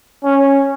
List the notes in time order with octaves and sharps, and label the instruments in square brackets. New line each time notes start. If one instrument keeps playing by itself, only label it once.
[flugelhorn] C#4